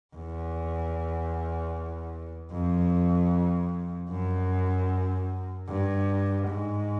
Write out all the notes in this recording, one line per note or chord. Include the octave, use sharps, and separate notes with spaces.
E2
F2
F#2
G2
G#2